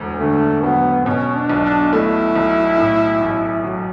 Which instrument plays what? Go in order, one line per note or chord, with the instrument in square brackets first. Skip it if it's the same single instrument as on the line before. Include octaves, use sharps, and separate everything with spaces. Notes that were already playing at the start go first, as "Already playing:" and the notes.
Already playing: [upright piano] E1 D2
[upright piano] D3 [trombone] A3
[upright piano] F#3 [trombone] B3
[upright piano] B2 [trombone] C#4
[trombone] D4
[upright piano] B1
[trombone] D4
[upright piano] A3 [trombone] E4
[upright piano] B1
A2
A1
F#3